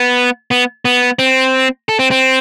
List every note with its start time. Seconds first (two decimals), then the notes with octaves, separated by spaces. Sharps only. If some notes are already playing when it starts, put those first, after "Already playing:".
Already playing: B3
0.51 B3
0.85 B3
1.19 C4
1.89 A4
1.99 C4
2.11 C4